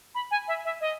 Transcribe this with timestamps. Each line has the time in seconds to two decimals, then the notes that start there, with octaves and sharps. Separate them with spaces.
0.15 B5
0.31 G#5
0.48 E5
0.65 E5
0.81 D#5